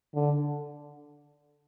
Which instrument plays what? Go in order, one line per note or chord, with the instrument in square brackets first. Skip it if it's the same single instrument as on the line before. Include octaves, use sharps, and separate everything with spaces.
[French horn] D3